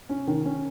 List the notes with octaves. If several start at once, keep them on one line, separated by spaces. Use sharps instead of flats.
C#4
D#3
C#4